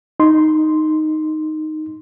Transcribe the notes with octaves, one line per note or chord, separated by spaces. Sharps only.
D#4 C6